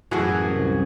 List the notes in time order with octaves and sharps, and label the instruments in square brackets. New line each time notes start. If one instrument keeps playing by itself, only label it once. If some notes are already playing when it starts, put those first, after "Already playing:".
[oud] F#2 E3 [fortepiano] A2 F#4 G#4
[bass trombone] C2